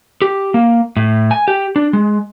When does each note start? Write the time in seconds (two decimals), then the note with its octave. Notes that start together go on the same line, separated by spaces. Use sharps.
0.22 G4
0.54 A#3
0.97 A2
1.31 G#5
1.48 G4
1.76 D4
1.93 G#3